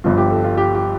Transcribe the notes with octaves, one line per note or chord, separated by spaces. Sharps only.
G1 G2 F3 F4
G4
A4
F4
G4
G4